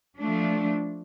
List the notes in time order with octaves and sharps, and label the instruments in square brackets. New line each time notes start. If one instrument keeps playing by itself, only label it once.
[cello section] F3 A3 D4